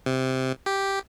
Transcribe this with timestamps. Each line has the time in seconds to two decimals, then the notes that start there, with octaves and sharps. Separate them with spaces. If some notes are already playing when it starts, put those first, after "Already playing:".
0.06 C3
0.66 G4